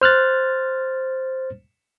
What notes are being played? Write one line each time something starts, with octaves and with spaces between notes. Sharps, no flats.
C5 F6 F#6 A6